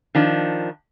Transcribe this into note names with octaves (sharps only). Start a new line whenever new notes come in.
D#3 F3 D4